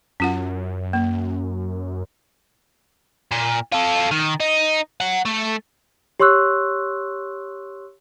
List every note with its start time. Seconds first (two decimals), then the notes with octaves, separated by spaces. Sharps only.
0.20 F#2 C#4 F4 F#5
0.93 A#3
3.31 A#2
3.72 F4 A4
4.11 D#3
4.40 D#4
5.01 C#5 F#5
5.26 A3
6.20 G4 C#5 C6 C#6 E6 F#6